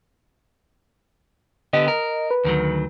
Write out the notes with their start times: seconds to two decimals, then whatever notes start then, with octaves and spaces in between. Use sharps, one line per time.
1.73 D3 B3 G4 D#5
1.88 A#4
2.31 B4
2.44 D2 D#3 F#3